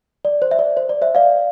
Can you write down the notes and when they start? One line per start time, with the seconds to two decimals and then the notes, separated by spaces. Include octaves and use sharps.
0.25 D5
0.42 C5
0.51 E5
0.59 D5
0.77 C5
0.89 D5
1.02 C5 E5
1.15 D5 F5